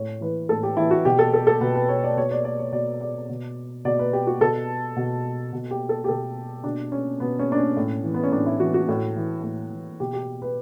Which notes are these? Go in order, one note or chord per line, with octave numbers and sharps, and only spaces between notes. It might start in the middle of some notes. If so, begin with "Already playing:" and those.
Already playing: A2 C#5
E3 B4
A2 A4
G4
E3 E4
F#4
B2 G4
A4
A4
A4
B2 B4
B4
C#5
D5
B2 C#5
D5
D5
C#5
B2 D5
D5
B2
B2 D5
B4
G4
F#4
B2 A4
B2
B2
G4
A4
G4
B2 A4
B2 D4
C#4
B2 B3
C#4
D4
C#4
A2
E3
B3
C#4
A2 D4
E4
E3 F#4
F#4
A2
E3
A2
E3
B2 G4
G4
B4